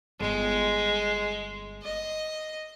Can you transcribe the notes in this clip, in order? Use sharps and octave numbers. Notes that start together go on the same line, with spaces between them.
G1 G#3
D#5